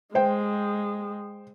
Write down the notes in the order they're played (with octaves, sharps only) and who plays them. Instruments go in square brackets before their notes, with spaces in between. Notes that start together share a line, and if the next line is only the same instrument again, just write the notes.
[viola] G#3 [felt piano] C5 G5